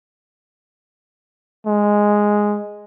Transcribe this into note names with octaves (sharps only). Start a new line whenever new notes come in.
G#3